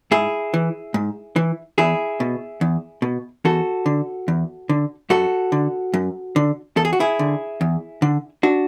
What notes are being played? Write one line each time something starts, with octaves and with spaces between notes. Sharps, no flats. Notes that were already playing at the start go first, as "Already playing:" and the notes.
G#2 E4 G#4
E3
G#2
E3
E2 E4 G#4
B2
E2
B2
E2 F#4 A4
D3
E2
D3
F#2 F#4 A4
D3
F#2
D3
E2 A4
G#4
F#4
E4 G#4
D3
E2
D3
D4 F#4